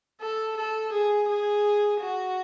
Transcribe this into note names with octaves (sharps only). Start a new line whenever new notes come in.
A4
A4
G#4
G#4
F#4